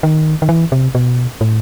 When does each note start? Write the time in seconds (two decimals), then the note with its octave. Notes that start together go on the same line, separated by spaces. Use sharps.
0.03 D#3
0.42 D#3
0.49 E3
0.72 C3
0.95 B2
1.41 A2